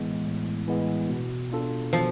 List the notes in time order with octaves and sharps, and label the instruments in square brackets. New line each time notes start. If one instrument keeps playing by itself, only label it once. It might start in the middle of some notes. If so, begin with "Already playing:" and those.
Already playing: [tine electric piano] A2 E3 G#3 B3
A2
E3 G#3 B3
B2
B3 D4 F4 A4
[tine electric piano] B2 [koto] F3